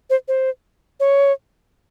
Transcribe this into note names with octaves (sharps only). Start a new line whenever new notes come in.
C5
C5
C#5